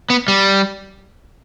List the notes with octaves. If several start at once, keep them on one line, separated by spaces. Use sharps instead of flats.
B3
G3